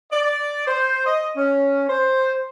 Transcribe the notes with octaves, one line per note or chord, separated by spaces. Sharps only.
D5
C5
D#5
C#4
C5